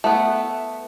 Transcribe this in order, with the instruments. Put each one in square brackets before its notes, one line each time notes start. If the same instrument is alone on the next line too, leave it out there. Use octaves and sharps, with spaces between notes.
[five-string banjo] A3 B3